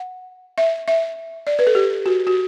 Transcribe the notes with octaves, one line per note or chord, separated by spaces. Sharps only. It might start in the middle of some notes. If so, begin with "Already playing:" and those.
Already playing: F#5
E5
E5
D5
B4
A4
G4
F#4
F#4